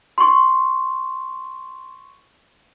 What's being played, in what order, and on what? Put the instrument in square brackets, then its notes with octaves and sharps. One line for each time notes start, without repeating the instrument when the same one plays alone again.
[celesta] C6 C#6